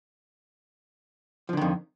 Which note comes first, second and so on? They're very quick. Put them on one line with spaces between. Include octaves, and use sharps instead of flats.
F3 D3 D#3 F2